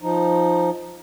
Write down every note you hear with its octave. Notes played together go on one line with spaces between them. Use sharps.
F3 D#4